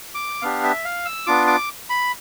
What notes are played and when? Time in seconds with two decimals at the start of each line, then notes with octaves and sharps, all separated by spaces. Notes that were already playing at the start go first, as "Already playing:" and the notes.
0.14 D6
0.42 B3 D4 G4 F5
0.63 E5
0.85 F5
1.05 E6
1.27 B3 D4 F4 D6
1.47 D6
1.90 B5